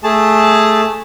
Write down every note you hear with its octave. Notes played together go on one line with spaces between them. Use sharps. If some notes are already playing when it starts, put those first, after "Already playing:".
A3 G#4 A5